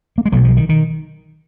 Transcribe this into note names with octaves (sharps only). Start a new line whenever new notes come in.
A#3
G#3
B1 B2 F#3
F3
D#3
D#3